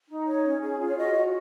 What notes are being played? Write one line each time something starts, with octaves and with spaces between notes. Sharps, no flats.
D#4
C#5
C#4
G#4
F4
C#5
F#4 D#5
F#4